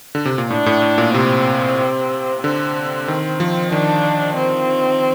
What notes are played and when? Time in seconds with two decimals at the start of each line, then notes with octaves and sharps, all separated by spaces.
0.15 D3
0.25 C3
0.38 A#2
0.50 A2 D4
0.66 A2
0.82 A2
0.98 A#2
1.14 C3 C4
2.43 D3 C4
3.08 D#3
3.40 F3
3.72 D#3 D4
4.37 C4